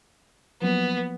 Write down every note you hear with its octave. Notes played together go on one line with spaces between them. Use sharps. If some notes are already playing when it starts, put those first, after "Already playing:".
F3 F#3 A#3 B3